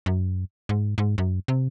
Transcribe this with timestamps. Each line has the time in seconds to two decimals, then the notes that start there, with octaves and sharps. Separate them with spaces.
0.06 F#2
0.69 G#2
0.98 G#2
1.18 F#2
1.48 C3